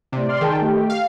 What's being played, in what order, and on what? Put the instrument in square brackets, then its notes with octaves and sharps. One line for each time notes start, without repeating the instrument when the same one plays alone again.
[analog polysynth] A2 D5 [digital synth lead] C3
[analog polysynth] D5 C6 F6
[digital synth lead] D#3 [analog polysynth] G#4 G5 A5
[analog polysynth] A3 G4
[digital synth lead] F5